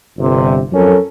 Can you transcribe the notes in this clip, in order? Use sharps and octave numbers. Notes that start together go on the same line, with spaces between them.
G1 C3
F2 F#3 C#4 A4 A#4